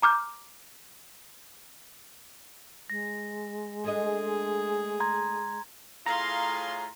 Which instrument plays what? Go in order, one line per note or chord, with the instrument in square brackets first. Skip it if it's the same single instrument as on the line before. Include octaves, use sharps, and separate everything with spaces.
[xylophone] A#5 D6 F6 G6
[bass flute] G#3 [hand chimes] A#6
[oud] A3 D4 D#5 [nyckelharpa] G#4
[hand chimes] A#5 C6 G#6
[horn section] A2 F4 G#4 [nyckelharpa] F5 C6 [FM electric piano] A#5